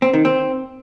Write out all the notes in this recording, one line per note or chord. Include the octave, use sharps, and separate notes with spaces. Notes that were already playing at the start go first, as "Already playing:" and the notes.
C4
D#3
C4